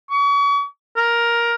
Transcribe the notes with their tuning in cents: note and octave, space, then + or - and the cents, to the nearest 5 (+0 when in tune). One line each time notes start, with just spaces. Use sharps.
C#6 +40
A#4 +10